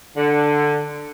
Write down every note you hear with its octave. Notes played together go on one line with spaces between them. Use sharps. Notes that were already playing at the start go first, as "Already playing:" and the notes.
D3